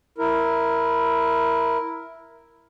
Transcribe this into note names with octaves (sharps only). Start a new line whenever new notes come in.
E4 A#4